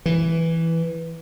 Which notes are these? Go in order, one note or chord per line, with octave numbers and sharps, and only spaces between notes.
E3